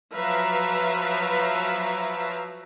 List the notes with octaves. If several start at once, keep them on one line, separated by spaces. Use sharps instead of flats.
F3 F#3 B4 E5 F5 A#5